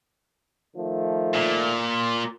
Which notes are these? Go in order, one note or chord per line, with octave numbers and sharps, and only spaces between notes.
D#3 F3 A3
A#2